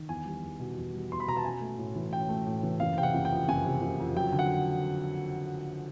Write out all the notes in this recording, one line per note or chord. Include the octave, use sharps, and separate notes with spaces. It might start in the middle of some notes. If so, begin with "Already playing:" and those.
Already playing: D#3
E2 G#5
G3
E2
B2
E2
G3
E2 C6
B5
B2 A#5
A5
C#4 G#5
A3
A2
E3
C#4 G5
A3
A2
E3
F#1 F5
C3 G5
F#5
F#1
G5
F2
F#1 G#5
C3
F#1
F2
F#3 G5
D3
F#5